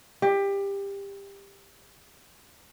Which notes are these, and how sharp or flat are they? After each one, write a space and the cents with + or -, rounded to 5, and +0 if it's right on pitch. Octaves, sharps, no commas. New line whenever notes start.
G4 +20